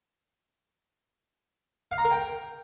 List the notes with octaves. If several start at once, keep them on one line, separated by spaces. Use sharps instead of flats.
F5
A#5
A#4
G5